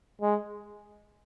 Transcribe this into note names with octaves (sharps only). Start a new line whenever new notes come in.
G#3